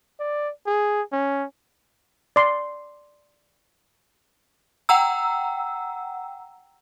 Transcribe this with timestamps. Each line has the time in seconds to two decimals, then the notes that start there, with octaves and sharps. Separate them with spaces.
0.20 D5
0.67 G#4
1.12 C#4
2.36 D5 C6
4.89 F#5 G5 A#5 E6